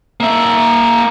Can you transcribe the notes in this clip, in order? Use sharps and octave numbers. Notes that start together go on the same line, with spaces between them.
A#3 E5